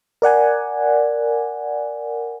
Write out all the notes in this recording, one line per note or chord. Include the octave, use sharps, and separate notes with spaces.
A#4 D5 F#5 G#5